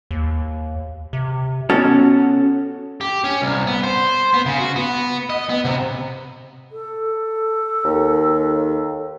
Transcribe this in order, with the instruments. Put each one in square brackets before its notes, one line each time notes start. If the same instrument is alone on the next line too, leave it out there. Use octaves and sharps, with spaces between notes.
[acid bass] D#2
C3
[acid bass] B3 [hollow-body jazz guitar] C#4 F#4 A4
[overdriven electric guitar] G4
C#4
C2
B3
C5
B3
C#3
F#4
B3
D#5
B3
C3
[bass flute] A4
[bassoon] D#2